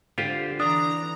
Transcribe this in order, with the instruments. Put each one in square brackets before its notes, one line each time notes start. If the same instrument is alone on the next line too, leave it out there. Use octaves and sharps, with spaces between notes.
[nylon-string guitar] D3 [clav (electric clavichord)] F4 G4 C5
[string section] E3 A#5 [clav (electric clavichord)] D4 [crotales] D#6